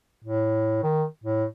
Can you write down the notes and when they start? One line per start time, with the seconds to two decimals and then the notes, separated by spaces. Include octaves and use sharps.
0.24 A2
0.83 D#3
1.24 A2